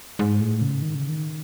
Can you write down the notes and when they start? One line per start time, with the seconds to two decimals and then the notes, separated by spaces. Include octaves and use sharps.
0.19 G#2
0.40 A2
0.61 C#3
0.82 D#3
0.95 C#3
1.09 D#3